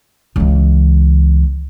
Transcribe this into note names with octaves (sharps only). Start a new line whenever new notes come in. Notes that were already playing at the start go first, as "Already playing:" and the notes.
C#2 E3